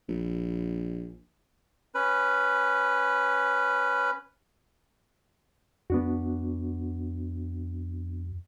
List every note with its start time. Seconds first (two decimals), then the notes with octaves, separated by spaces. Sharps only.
0.09 A#1
1.95 C#4 B4
5.90 F2 B3 D4 F#4